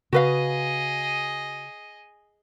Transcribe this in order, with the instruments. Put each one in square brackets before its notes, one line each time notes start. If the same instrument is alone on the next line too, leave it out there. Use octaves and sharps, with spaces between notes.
[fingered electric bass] C#3 [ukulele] F#4 B4 F5 [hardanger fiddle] G#4 D#5